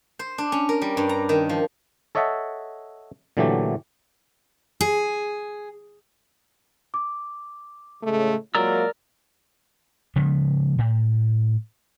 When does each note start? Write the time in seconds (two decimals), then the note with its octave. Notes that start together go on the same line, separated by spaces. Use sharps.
0.19 C5
0.38 D4
0.52 C#4
0.69 A#4
0.82 G3
0.97 G2
1.09 A#5
1.29 D#3
1.49 F3
2.15 A4 C#5 D#5 E5 F#5 A5
3.37 A#2 D3 E3 F#3 A3 G4
4.81 G#4
6.94 D6
8.03 A2 C#3 G#3 A3
8.55 F#3 G#3 A#3 F4 A#4 D5 A#5 E6
10.16 C#3 F3 G#3 B3
10.78 A2